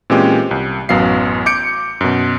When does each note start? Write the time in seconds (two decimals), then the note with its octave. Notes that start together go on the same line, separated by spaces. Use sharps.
0.10 A#2 E3 G#3 C4 C#4 G4
0.51 C2
0.89 A1 F#2 F#3 B3 F5 C7
1.46 D6 G6 C#7 D7
2.01 F#2 B2